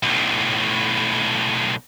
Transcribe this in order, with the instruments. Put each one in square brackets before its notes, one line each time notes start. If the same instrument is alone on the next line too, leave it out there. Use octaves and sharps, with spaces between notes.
[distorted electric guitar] B1 A2